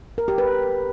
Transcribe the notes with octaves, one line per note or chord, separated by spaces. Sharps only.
A#4
G4
B4